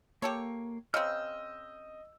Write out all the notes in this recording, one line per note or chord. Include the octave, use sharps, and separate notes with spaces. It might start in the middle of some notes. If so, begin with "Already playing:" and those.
A#3 G4 A4 C#5
C#3 C4 D#5 E6 F6 G6